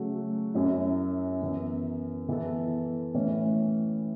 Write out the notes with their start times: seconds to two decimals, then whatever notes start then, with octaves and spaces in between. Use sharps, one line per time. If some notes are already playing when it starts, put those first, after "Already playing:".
Already playing: C#3 F#3 A3 F#4
0.54 F#2 F#3 C#4 E4
1.41 F#2 E3 B3
2.29 E3 B3 A4
3.14 A2 E3 C#4